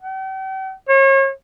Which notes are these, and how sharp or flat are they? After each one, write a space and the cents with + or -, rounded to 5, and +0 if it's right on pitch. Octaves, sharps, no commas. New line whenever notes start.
G5 -45
C#5 -35